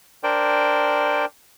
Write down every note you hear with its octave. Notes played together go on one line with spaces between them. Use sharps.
D4 A#4 C5 D5 G5